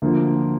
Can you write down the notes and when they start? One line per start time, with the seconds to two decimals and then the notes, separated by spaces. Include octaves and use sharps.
0.02 D2 D3 F3 A#3